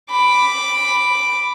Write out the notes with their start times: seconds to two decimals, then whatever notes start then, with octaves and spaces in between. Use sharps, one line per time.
0.11 B5 D6